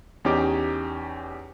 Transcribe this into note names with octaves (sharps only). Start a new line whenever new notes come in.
E2 C#4 D#4 G4 D6